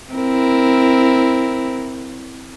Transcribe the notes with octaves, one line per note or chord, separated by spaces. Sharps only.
C4 E4 A#4